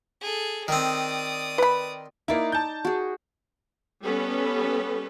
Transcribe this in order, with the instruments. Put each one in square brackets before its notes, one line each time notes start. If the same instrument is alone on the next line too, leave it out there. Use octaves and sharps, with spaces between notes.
[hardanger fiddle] G#4 A4
[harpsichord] D#3 C4 [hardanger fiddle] D5 D#6
[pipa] B4 B5
[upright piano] A#3 E4 [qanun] D#4 D5
[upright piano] A5 G6
[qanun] F#4 G#4
[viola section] G3 B3 C#4 A4 B4